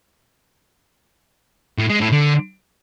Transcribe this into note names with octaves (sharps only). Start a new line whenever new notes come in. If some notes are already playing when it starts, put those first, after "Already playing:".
A2
G#3
A2
D3